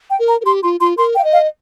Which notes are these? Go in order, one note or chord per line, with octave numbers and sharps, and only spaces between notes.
G5
A#4
A#5
A#4
G4 C6
F4 C6
F4 C6
A#4 C6
G5
F5
D#5
F5